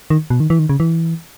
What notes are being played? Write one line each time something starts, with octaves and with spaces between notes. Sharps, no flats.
D#3
B2
D#3
E3
D#3
C#3
E3